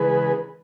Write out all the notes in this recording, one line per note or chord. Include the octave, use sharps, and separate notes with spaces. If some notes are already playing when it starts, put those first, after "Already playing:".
Already playing: C#3 E3 G#3 G#4 B4